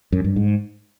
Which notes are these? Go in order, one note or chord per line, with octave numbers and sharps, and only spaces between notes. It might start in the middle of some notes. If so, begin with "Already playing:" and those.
F#2
G2
G#2